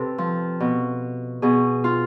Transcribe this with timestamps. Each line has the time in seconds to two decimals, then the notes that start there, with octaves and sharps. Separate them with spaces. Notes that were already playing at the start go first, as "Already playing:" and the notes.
Already playing: C3 A4 B4
0.18 F3
0.60 B2
1.42 B2 G#4
1.84 F4